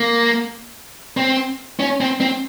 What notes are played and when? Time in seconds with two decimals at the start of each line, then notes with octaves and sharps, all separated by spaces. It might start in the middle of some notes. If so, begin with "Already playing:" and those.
Already playing: A#3
1.17 C4
1.79 C#4
2.01 C4
2.21 C4